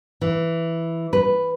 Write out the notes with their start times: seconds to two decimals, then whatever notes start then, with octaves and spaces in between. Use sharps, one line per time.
0.21 E3
1.13 B4